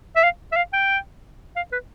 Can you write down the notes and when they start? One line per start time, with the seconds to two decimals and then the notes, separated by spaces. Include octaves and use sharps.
0.16 E5
0.24 F5
0.52 E5
0.57 F5
0.73 G5
1.56 F5
1.72 B4